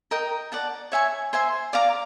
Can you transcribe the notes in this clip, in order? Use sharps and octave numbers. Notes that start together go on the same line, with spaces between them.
A#4 D#5 G5
D5 F#5 A5
C#5 E5 G#5 C#6
C5 E5 G#5 C6
D5 F5 A#5 D6